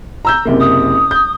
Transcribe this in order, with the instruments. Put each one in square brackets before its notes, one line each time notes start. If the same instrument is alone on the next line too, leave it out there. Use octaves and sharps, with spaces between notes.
[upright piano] A#5 E6 G6
F#1 C3 A#3
[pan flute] D#6
[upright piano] G6